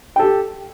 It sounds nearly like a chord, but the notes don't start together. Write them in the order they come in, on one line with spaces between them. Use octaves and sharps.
G5 A4 G4